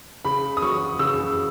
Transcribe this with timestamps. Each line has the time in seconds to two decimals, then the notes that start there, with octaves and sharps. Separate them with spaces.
0.25 C#3 B5
0.57 D#6
0.62 F#3 C#6
0.99 C#3 E6